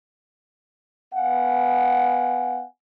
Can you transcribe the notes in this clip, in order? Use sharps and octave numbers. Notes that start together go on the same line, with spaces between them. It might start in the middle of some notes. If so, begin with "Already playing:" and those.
B3 F5 F#5 G#5